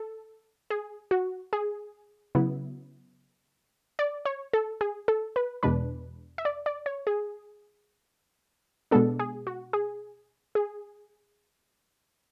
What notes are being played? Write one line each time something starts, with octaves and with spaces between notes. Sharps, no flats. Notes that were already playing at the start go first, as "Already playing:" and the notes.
Already playing: A4
G#4
F#4
G#4
C#3 F#3 B3 E4
D5
C#5
A4
G#4
A4
B4
E2 B2 G#3 D4 B4
E5
D5
D5
C#5
G#4
B2 G#3 B3 D4 A4
G#4
F#4
G#4
G#4